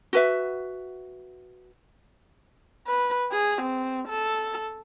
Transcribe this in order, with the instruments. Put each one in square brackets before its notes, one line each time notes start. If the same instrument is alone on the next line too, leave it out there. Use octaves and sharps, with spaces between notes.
[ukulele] F#4 B4 E5
[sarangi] B4
G#4
C4
A4